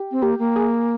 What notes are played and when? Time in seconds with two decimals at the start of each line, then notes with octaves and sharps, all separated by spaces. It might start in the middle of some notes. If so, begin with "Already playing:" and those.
Already playing: G4
0.12 C4
0.22 A#3 G4
0.39 A#3
0.56 G#4